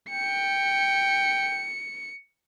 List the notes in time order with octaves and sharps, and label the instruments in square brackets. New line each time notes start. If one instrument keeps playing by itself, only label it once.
[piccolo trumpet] G5 [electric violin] C#7